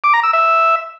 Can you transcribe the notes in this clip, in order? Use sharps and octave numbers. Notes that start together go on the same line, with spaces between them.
D6
A#5
E6
E5